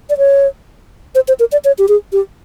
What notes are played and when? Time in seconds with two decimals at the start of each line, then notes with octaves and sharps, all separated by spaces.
0.10 D5
0.18 C#5
1.15 C5
1.28 C5
1.40 A#4
1.52 D5
1.65 C#5
1.79 G4
1.88 G#4
2.12 G4